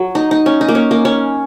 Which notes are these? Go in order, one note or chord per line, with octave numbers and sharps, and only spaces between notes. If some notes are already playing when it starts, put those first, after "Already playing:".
Already playing: F#3
D#4
D#4
C#4
D#4
A#3
C#4
A#3
C#4